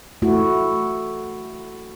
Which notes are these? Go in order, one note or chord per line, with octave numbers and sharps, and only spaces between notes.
A3 E4 F#4